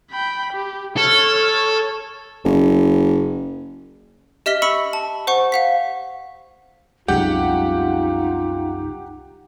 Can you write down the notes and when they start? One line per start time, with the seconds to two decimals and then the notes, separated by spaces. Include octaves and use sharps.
0.11 G5 B5
0.53 G4
0.97 A4 C#5 F6
1.44 C#5
2.44 F#1
4.46 G4 D#5 E5 F6 B6 G7
4.62 B5 C#6 E6 C#7 F#7
4.93 A5
5.27 C5 F#5 C#6
5.52 F5 F#5 B6
7.08 C2 F#2 G#3 D#4 F4 G4 F#5 G6